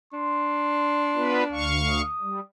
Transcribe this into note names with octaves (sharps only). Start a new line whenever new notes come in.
D4 C6
B3 F4 B4
D2 F5 C#6
D#6
G3